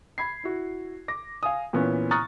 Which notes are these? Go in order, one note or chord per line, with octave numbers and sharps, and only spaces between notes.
B5 G#6 C7
E4 F#4
D6 A#6
F5 G#5 D#6
A#2 E3 B3 C#4
A#5 C#6 D#6 F6 F#6 A6